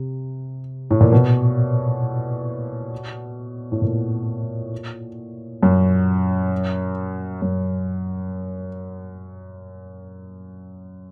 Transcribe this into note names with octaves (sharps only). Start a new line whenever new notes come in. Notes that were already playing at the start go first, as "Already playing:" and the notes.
Already playing: C3
A2
A#2
B2
A2
A#2
F#2
F#2